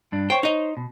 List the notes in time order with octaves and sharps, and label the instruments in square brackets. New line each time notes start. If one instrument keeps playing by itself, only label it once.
[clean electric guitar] G2 D4
[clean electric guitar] C5 C#5 [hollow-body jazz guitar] G5
[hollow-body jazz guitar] D#4 D#5
[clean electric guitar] B2